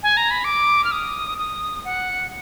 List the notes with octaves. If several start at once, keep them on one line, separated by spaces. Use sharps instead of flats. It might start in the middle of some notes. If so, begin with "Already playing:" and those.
G#5
A#5
B5
D6
F6
D#6
D#6
F#5